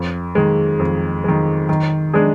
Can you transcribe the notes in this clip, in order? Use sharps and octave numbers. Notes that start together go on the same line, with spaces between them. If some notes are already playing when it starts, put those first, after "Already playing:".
Already playing: F2
D#3 G#3
F2
D#3 G#3
D#3
G#3 D4 G#4